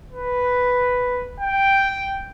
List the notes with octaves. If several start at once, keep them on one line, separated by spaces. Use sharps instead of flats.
B4
G5